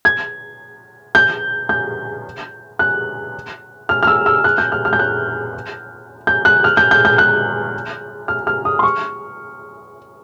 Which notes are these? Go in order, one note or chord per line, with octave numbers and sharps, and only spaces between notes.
G#6
G6
G6
F#6
F6
F6
E6
E6
F#6
G6
F6
F6
G6
F#6
G6
F#6
F6
G6
G6
G6
F#6
F6
F6
D#6
C6
C#6